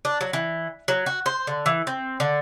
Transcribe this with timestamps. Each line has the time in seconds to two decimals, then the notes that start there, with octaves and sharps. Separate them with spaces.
0.05 D4
0.21 F#3
0.33 E3
0.88 F#3
1.06 F#4
1.26 C5
1.47 D3
1.66 E3
1.87 C4
2.20 D3